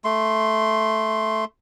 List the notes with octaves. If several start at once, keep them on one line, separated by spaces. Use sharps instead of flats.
A3 C6